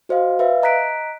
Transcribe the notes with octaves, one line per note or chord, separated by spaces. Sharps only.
F#4 C5 D#5 F5
B4 E5 F5
D#5 A#5 F#6 B6 D7